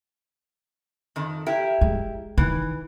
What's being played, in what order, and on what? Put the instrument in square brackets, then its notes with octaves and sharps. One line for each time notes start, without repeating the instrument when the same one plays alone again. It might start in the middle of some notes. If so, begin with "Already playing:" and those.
[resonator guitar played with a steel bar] F2 D#3
E4 G4 A#4
[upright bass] G#3
[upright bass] D#3 [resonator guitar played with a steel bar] E3